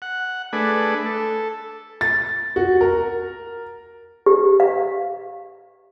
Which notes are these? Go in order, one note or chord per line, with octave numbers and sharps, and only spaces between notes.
F#5
A3 D4 G#4 B4
A4
A6
F#4
A#4
G4
F5